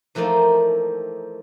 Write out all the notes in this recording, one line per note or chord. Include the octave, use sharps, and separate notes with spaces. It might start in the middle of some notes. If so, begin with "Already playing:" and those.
E3 F3 A3 A#3 C4 D#4